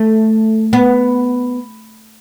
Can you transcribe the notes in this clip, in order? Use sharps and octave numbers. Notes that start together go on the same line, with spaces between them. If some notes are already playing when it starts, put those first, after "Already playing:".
Already playing: A3
B3